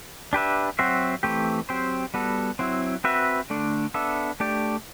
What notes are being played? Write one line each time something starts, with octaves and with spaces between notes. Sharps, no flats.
D4 G4 B4 E5
F#3 C4 F#4 C5 E5
E3 A3 C4 G4
F#3 C4 G4 C5
G3 B3 F#4 A4
F#3 C4 E4
C4 F#4 B4 E5
D3 A3 D4
B3 D4 A4 E5
A3 D4 G4 D5